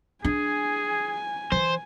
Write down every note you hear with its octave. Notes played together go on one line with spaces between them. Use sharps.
D4 G#4 G#5
E3 C5